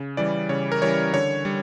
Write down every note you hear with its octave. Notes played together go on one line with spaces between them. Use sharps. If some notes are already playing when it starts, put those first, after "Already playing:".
Already playing: C#3
E3 G3 C#4 D5
C#3 C#5
A#4
E3 G3 C#4 C#5
D3 C#5
G3